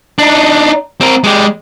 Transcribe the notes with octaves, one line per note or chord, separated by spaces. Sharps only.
D4 D#4
C4 A#4
G#3 G4